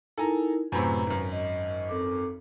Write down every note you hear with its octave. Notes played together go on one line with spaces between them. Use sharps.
D#4 E4 A4 A#4 G#5 A#5
F#2 A2 C3 B4 A#5
G#1 F#2
D#5
C4 A4 D6